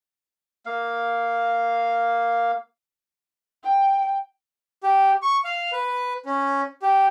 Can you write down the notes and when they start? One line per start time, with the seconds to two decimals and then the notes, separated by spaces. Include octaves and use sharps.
0.66 A#3 F5
3.63 G5
4.83 G4
5.22 C#6
5.44 F5
5.72 B4
6.25 C#4
6.82 G4